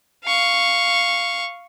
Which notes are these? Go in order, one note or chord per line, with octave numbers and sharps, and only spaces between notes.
F5 C#6